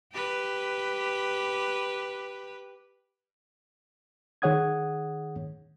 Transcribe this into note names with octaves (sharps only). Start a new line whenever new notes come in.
G4 B4
D#3 G#4 C#5 F#5 D#6 G#6